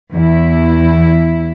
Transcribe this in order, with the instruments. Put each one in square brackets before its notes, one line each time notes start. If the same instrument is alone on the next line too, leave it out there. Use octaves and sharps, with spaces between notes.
[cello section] E2 E4